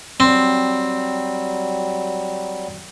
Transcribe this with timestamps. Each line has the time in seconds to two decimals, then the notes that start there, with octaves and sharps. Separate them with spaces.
0.20 F#3 G3 C4